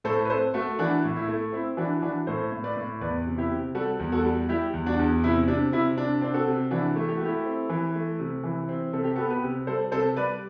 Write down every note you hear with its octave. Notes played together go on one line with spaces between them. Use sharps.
A2 A4 C5
B4
C4 A4 C5
A3 F#4 A4
E3 D4 F#4
A2
E4
A3
C4 E4
E3 D4 F#4
E3 D4 F#4
A2 A4 C5
A2
B4 D5
A2
E2 B4 D5
C3
E4 G4
C3
G3 F#4 A4
E2
F#4 A4
G3
G3 E4 G4
E2
D4 F#4
E2
C3 E4
C3 D4
C3 E4
C3 D4
C4 D4
F#4 A4
C3
E3 D4 F#4
A3
G4
F#4
A3 E4 G4
C4
E3
A3
C3
E3
C4
C3 A4
G4
B3 F#4 A4
G4 B4
C3
G3 A4 C5
C3 A4 C5
G3 B4 D5